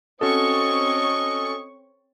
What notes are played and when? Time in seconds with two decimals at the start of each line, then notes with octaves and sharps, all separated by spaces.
0.21 C4 C#4 F#4 A4 C#5 D#5 C#6